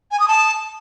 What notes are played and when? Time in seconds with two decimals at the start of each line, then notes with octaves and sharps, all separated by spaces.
0.11 G#5
0.20 D#6
0.28 A5